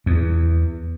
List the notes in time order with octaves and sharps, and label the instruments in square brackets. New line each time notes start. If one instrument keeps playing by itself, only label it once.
[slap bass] E2